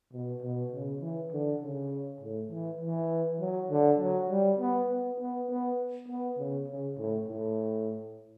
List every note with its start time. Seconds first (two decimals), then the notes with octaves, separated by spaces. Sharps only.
0.12 B2
0.42 B2
0.72 C#3
1.01 E3
1.32 D3
1.61 C#3
2.21 A2
2.51 E3
2.81 E3
3.40 F#3
3.70 D3
3.99 F#3
4.30 G3
4.59 B3
4.89 B3
5.19 B3
5.49 B3
6.08 B3
6.38 C#3
6.68 C#3
6.98 A2
7.28 A2